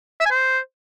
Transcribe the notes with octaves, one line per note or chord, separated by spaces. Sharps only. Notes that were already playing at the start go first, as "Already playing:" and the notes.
E5
G#5
C5